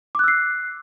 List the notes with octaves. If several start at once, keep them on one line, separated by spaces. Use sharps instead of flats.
D6 E6 F#6 C7